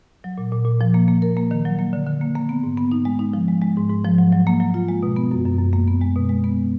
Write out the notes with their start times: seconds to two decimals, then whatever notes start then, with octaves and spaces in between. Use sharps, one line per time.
0.24 F#3
0.38 A#2
0.52 A#2
0.65 A#2
0.81 F3
0.94 A#3
1.08 A#3
1.22 A#4
1.37 A#3
1.51 D#3
1.65 F#3
1.79 A#3
1.93 D3
2.07 D3
2.21 A#3
2.35 A#3
2.49 B3
2.63 G#2
2.78 B3
2.92 D#4
3.05 G#3
3.19 D#4
3.34 F3
3.48 G#3
3.62 G#3
3.77 G#2
3.90 G#2
4.05 F3
4.18 F#3
4.32 F#3
4.47 A#3
4.60 F#3
4.74 F4
4.88 G#3
5.03 B2
5.16 B3
5.31 F#2
5.45 F#2
5.59 F#2
5.73 A#3
5.88 B3
6.01 G#3
6.16 B2
6.29 G#3
6.44 B3